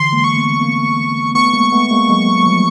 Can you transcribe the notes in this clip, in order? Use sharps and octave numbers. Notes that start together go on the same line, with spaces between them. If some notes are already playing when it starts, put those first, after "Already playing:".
Already playing: D3 E3 C6
G#3 A#3
C#6
A3 B3
A#3 C4
A3 B3 C#6
G#3 A#3
A3 B3
G#3 A#3
F#3 G#3
F3 G3